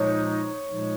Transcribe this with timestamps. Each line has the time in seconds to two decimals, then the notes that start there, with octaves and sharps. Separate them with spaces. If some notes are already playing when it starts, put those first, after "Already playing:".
Already playing: A#2 F3 G#3 D#4 C#5
0.67 A#2 F3 G#3 D#4